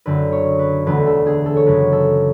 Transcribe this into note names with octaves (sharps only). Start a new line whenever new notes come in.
F#1 F#2 D3 B4
C#5
B4
E1 D2 D3 A3 B4
A4
G#4
A4
C#5
F#2 C#3 G#3 B4
A4